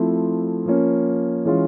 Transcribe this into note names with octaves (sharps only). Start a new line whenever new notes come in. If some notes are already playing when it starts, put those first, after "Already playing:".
Already playing: F3 A3 C4 E4
F3 A#3 C#4
E3 G#3 C#4 F4